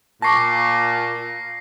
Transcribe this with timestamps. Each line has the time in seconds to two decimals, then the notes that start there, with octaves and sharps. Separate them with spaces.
0.22 A#2 A5 C#6 D6 A#6 C7